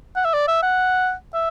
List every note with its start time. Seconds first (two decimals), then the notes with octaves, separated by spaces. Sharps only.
0.16 F#5
0.25 E5
0.34 D5
0.48 E5
0.63 F#5
1.34 E5